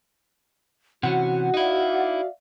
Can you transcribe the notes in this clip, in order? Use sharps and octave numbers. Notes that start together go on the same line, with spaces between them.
C3 E3 C#4 F#4 F#5
D#4 E4 D5 E5 F5